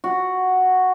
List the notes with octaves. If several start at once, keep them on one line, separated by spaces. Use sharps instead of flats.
F#4